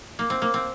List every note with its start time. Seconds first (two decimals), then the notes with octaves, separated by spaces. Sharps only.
0.19 A#3
0.30 C4
0.42 A#3
0.54 C4